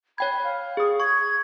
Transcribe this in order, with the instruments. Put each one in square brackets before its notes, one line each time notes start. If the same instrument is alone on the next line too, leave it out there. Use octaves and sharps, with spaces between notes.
[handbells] C#5 G5 G#6 [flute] B5
[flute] F5
[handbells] G#4 D#6
[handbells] C#6 [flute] G#6